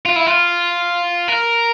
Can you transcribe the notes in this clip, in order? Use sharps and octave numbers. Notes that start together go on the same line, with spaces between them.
F4
E4
F4
A#4